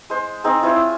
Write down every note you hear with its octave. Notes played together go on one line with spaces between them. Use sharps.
G#3 C5
G#3 C4 D#4 G#4
E4 F4 C5 C#5